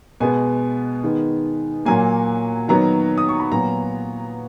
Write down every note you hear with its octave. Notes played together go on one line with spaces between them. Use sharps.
B2 G#3 B3 G#5
D#3 G#3 B3
A#2 F#3 A#3 G#5
D#3 F#3 B3 A#5
D#6
C#6
B5
A#2 F#3 B3 A#5